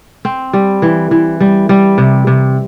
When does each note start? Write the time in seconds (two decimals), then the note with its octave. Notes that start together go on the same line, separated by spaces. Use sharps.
0.25 C4
0.53 G3
0.82 E3
1.11 E3
1.41 G3
1.69 G3
1.98 C3
2.27 C3